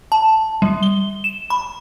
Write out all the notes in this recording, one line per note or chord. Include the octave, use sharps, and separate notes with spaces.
A5
G3
G7
E7
B5